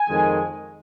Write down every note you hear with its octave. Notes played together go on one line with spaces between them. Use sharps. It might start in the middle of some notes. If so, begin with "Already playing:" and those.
Already playing: G#5
F2 D#3 G#3